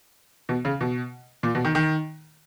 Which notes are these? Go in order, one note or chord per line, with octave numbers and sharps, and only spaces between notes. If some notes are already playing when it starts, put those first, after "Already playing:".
B2
C#3
B2
A#2
B2
D#3
D#3